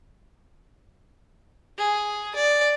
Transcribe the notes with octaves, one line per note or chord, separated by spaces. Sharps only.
G#4
D5